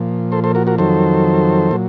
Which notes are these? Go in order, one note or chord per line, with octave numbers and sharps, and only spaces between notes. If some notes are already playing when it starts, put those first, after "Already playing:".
Already playing: A#2 F3
A4 C5
A4 C5
F#4 A#4
F#4 A#4
F2 D#3 F#3 A4 C5
A#2 F#3